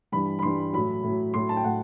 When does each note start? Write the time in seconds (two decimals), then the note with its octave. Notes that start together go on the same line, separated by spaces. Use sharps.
0.12 G2 E3 G3 B5
0.39 B5
0.42 G2 E3 G3 C6
0.73 A2 F#3 B5
1.03 A2 F#3
1.34 A2 F#3 C6
1.49 A5
1.57 G5
1.64 A2 F#5